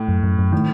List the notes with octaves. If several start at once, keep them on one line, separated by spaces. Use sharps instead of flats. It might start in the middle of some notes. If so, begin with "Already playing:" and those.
Already playing: A2
F#2
F#2
F#2
A2 D#3